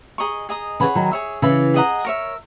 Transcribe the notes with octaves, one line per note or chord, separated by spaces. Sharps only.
G#4 D#5 A#5 C#6
G#4 D#5 A#5 D#6
C#3 E3 G#4 C#5 F#5 B5
D#3 F#3
G#4 C#5 E5
C#3 E3 C#5 E5 B5
G#4 D#5 F#5 A#5
A#4 C#5 E5